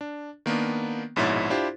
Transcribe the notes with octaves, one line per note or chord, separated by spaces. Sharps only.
D4
D#3 A#3 B3 D4
A#1 G#2 B2 E4 C#5 A6
D4 E4 F4 G4 C5